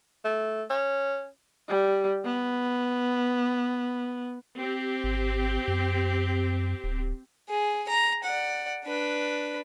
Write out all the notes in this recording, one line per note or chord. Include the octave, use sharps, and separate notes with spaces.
A3
C#4
G3
B3
C4 G4
G#1
F#2
D1
G#4
A#5
D5 F#5
D4 B4